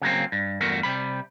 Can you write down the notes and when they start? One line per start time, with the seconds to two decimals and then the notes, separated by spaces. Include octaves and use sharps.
0.02 C#3 F#3 A#3 C4
0.32 G2
0.61 E2 G2 A3 F#4 A#4
0.83 C3 G3 B5